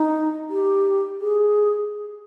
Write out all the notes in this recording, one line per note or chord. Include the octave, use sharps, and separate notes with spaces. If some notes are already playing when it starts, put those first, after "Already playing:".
Already playing: D#4
G4
G#4